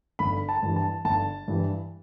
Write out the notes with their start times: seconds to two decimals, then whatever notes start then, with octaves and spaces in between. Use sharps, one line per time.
0.19 G1 B5
0.49 A5
0.63 G2 E3
0.76 A5
1.05 G1 A5
1.48 G2 E3